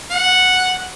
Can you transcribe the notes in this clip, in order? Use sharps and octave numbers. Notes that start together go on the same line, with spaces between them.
F#5